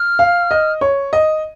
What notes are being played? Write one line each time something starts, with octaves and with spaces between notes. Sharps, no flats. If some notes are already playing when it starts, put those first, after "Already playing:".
Already playing: F6
F5
D#5
C#5
D#5